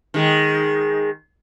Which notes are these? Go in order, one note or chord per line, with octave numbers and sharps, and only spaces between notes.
D#3 G#3